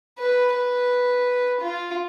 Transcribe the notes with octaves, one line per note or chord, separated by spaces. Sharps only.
B4
B4
F4